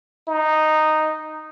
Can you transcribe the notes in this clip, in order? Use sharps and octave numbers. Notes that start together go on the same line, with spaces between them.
D#4